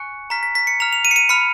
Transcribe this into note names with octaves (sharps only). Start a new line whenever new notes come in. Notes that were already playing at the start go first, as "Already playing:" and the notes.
Already playing: G#5 C#6 F#6 C#7
A#5 F6 B6
B6
B6
C#7
A#5 F6 F7
F7
D#7
C#7
D#7
B5 F6 C#7